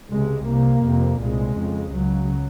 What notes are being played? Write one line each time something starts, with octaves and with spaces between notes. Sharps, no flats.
C#2 C3 G#3
C2 C3 A#3
F2 C3
C2 A#2 G#3
F2 C#3
C#2 C#3 F#3